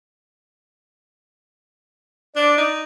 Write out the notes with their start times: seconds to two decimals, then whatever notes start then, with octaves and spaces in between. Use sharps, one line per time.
2.36 D4 D5
2.58 D#4